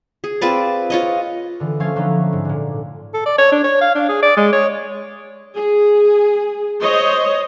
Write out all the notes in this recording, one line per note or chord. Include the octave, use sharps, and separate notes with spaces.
G#4
C4 F4 B4 D5
F4 C#5 D#5
D3 E3
F3 A3 C#4 C#5 F5 G#6
D3 F#3 A3 B3 C#4 D#4
G#2
A#2 D3
A4
D5
C#5
D4
C#5
F5
D4
G#4
D5
G#3
C#5
G#4
C5 C#5 D#5